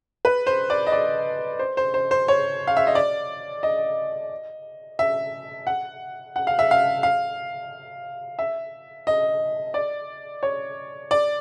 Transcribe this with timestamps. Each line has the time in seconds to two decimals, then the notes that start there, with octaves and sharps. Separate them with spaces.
0.25 B4
0.47 C5
0.70 D5
0.87 D#5
0.92 D5
1.59 C5
1.77 C5
1.94 C5
2.11 C5
2.28 C#5
2.67 F5
2.77 E5
2.87 D#5
2.95 D5
3.63 D#5
4.99 E5
5.67 F#5
6.36 F#5
6.47 F5
6.59 E5
6.71 F5
7.03 F5
8.39 E5
9.07 D#5
9.74 D5
10.43 C#5
11.11 D5